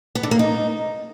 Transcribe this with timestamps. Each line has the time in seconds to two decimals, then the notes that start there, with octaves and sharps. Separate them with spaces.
0.15 B3
0.23 D3
0.31 A#3
0.39 D#4